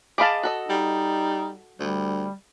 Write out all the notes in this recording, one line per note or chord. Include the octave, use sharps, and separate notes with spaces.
G#4 D#5 F5 A5 B5 D6
F#4 A4 D#5
G3 D#4
D2 G3